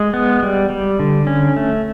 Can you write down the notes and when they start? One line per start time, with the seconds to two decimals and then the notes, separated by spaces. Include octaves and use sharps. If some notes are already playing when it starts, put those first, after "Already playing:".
Already playing: G#3
0.14 B3
0.43 G3
0.70 G3
0.99 D3
1.27 C#4
1.56 A3